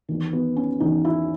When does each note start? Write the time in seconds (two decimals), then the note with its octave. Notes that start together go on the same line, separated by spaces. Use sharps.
0.09 E2 D#3
0.33 B3
0.56 C#4
0.80 E2 D#3 D#4
1.05 E4